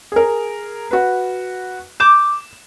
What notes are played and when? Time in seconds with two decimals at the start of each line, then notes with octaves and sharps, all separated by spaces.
0.12 G#4 A#4
0.91 F#4 B4
2.00 D6 G6 E7